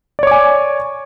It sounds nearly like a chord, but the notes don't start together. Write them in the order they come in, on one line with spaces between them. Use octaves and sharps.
D5 C#5 D6 G#5